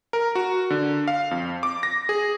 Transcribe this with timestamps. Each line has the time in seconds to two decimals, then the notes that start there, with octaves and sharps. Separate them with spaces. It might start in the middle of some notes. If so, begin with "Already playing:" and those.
0.13 A#4
0.35 F#4
0.70 D3
1.08 F5
1.31 F2
1.63 D6
1.83 A#6
2.09 G#4